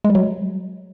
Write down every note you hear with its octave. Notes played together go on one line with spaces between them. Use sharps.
G#3
G3
F#3